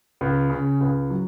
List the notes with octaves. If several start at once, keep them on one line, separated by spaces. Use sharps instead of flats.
C#2
C#3
C#2
F#3